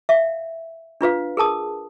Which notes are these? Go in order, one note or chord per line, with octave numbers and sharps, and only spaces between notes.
E5 F5
D4 F4 B4 F5
G#4 A#4 A5 D#6